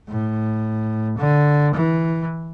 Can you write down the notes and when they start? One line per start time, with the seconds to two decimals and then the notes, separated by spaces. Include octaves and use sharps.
0.09 A2
1.18 D3
1.74 E3